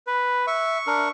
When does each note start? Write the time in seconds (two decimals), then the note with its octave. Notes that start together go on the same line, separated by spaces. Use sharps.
0.07 B4
0.47 E5 C#6
0.87 D4 A#4